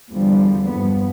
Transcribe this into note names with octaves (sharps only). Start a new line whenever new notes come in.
E2 D3 F3 G3
G2 F3 B3